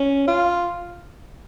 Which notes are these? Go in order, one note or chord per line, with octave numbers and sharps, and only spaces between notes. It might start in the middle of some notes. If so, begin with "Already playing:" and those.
Already playing: C#4
F4